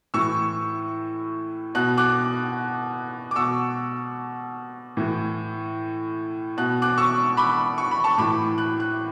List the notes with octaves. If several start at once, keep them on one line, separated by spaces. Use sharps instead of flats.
A2 E3 C#6 E6
B2 F#6
D6 F#6
D6
B2 C#6 E6
A2 E3
B2 F#6
D6 F#6
C#6 E6
B5 D6
C#6
B5
A5 C#6
A2 E3 B5 D6
F#6
F#6